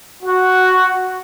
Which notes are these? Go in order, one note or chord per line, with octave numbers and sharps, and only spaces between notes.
F#4